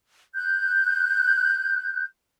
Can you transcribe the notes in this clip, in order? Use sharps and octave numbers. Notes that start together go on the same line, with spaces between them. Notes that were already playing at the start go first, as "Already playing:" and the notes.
F#6 G6